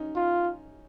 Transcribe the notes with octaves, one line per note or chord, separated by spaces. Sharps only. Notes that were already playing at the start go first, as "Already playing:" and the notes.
Already playing: C#4 D#4
F4